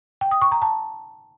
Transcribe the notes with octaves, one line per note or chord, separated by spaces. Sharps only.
G5
D#6
C#6
A#5
A5